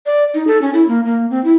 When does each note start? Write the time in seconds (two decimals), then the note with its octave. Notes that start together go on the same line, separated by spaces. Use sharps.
0.06 D5
0.34 D#4
0.47 A4
0.62 C#4
0.74 E4
0.88 A#3
1.06 A#3
1.30 C4
1.44 E4